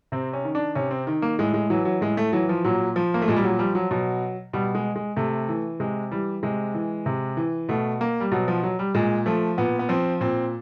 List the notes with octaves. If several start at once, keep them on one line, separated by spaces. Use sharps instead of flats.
C3 C4
C#4
D#3
D4
C3 C#4
C4
D#3
A#3
A2 G#3
G#3
E3 F#3
F#3
A2 G#3
A3
E3 F#3
F3
A#2 F#3
F3
A#3
A3
A#2 G#3
G3
F#3
F3 G3
F#3
B2 F#3
B2 G3
G#3
G#3
C3 A3
E3
C3 G#3
E3 G3
C3 G#3
E3
C3
E3
B2 A3
A#3
G3
B2 F#3
F3
F#3
G3
A#2 G#3
F3 A3
A#2 B3
B3
F3 C4
A#2 C4